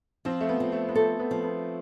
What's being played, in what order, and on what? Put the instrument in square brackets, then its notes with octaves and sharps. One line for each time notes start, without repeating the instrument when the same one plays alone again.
[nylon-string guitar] F3 [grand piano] C4
[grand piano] A3
B3
[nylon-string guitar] F3
[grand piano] A3
B3
[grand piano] A3 [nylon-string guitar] A4
[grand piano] B3
[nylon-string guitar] F3
[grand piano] B3